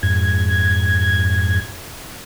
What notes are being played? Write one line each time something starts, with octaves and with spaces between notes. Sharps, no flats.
F2 G#2 G#6